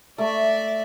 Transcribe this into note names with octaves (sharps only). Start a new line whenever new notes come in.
A3 D5 E5